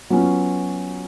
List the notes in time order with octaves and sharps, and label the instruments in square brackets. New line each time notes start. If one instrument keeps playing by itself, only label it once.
[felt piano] F#3 B3 C#4 F4